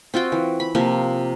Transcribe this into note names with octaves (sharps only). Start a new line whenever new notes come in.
C4 F4 F#4 G5
E3
B5
C3 F3 A#3